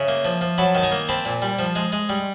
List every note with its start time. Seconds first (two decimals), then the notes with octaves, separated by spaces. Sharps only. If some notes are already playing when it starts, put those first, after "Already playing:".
Already playing: C#3 E5
0.08 A#3
0.25 F3
0.41 F3
0.58 F#3 A5 B5
0.75 D#3 A5
0.83 G#5 A#5
0.92 A#3
1.09 C4 A5 B5
1.25 A#2
1.42 G3
1.59 F3
1.76 G#3
1.92 G#3
2.09 G3